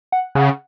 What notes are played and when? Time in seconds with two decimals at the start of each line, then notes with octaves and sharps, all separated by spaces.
0.12 F#5
0.35 C#3 F#5